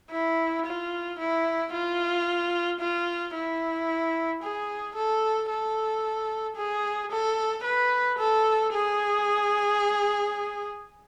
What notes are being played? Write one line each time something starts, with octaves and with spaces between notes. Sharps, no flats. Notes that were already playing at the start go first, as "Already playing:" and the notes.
E4
F4
E4
F4
F4
E4
G#4
A4
A4
G#4
A4
B4
A4
G#4